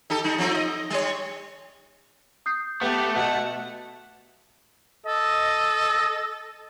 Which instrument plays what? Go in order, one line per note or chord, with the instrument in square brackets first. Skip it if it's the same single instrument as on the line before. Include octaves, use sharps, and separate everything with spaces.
[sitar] D#4 G4 A4
G3 D#4
F3 C4 D#4
D#5
G3 C#5
[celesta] D#6 G6 C7
[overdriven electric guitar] A3 A4 [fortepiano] B3 [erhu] G4
[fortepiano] B2 [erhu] F#5
[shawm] A4 [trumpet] D#5